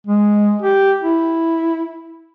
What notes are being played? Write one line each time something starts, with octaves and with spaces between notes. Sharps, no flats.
G#3
G4
E4